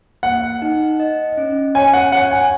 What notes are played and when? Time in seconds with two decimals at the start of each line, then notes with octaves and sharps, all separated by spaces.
0.23 A#3 F#5
0.62 D#4
1.00 D#5
1.37 C#4
1.75 C#5 G#5
1.93 F#5
2.12 C#5 F#5
2.31 G#5